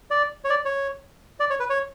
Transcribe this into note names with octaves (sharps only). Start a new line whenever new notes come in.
D5
C#5
D5
C#5
D5
C#5
B4
C#5